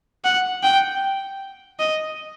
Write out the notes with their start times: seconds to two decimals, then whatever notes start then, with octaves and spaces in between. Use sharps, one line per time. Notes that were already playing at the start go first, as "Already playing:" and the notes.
0.24 F#5
0.63 G5
1.79 D#5